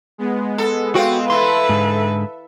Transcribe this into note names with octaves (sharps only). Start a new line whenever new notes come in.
G#3 B3
A4
C4 F4 F#4 G5
E3 A4 B4 E5 C6
G#2 D3